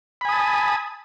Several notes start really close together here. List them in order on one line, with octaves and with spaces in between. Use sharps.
B5 G#5 D#6 A5